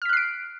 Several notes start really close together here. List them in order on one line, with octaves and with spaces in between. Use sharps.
F6 B6 F#6 C7 D7